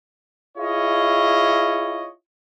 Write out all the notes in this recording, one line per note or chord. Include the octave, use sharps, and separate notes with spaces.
E4 F4 G#4 C#5 D#5